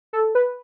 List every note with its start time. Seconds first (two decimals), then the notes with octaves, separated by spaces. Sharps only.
0.13 A4
0.35 B4